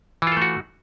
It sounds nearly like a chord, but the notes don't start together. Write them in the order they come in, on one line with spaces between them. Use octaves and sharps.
E3 F4 A4 A3 F#4